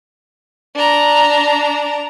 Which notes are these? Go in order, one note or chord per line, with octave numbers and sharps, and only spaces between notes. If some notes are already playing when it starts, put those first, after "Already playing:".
D4 A#5